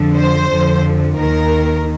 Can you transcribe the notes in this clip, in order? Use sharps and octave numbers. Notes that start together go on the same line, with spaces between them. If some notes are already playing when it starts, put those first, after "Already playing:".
Already playing: F2 D3 F3
C5
F2 D3 F3
D#2 D#3 A#4